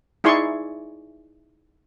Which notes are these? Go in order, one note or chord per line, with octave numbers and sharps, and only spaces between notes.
D#4 E4 G#4 D5 C6 C#6